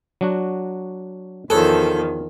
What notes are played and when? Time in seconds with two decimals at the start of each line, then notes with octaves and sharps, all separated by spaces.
0.21 F#3 D4 F#4
1.50 E2 D#3 F3 G#4 A4 B4 C#5